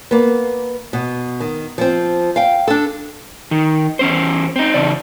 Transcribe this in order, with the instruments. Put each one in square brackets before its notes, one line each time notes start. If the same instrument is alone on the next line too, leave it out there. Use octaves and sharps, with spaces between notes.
[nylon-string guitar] A#3 B3
B2
D#3
F3 C4
F5 G5
D4 A4
[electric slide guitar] D#3
E2 C#4 C5
C4 D#4
E2 C#3 D5